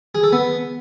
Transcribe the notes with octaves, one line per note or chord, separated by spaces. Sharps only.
G#4
A4
B3